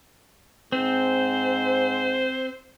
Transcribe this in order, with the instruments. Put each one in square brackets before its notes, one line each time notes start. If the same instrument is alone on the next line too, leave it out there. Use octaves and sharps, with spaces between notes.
[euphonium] G#2 [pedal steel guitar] C4 [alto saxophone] C5